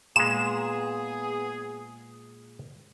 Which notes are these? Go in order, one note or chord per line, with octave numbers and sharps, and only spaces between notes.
A#2 G#3 B3 G#4 E7